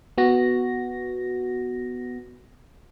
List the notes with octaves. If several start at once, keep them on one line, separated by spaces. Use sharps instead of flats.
B3 F#4 A#6